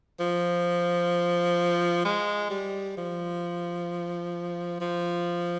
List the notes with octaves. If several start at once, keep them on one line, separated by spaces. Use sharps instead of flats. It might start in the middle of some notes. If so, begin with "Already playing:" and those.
F3
G#3
G3
F3
F3